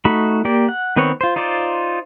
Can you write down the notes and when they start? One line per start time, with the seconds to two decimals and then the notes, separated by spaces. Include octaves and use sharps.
0.05 A3 D#4 F#4 B5
0.45 A#3 G4 D5
0.69 F#5
0.96 D#3 B3 C4 B4 C#5
1.21 F4 C5
1.36 D#4 F4 C5 D5